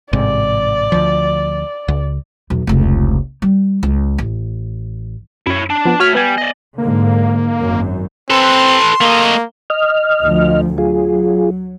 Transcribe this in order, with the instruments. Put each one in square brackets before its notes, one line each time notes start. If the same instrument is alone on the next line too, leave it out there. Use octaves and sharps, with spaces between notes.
[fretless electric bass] A1 G#2 C3 [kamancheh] D5
[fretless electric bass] D2 F3
C#2
[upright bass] B1 E2
F1 C#2
G3
C#2
A1
[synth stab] F#2 [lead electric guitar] E4 C#5
[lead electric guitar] D4
[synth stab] F3 B3
[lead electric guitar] A3 C#5 [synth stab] F#4 F6 B6
[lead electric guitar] G3 [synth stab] B3 G#5
[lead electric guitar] D5 D#5
[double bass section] G#2 D3 [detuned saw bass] A#3
[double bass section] G#1 F#2
[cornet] C4 [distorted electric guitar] A4 B4 [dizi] C6
[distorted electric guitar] A3 D#5 [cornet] A#3
[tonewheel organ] D#5 F6
[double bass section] D2 F3
[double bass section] F#3 [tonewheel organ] F4 G#4